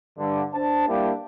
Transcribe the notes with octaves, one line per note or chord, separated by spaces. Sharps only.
G2 D3
D4 C5 A5
G3 A#3 D4 E4 G4